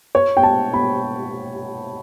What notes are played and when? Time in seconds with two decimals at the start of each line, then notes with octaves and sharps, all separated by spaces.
0.15 C#5
0.37 G5
0.43 A5
0.73 B5